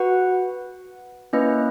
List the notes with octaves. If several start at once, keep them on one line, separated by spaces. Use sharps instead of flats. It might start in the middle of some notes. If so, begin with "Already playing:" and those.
Already playing: F#4 B4 F#5
A#3 C#4 E4 B4 D#5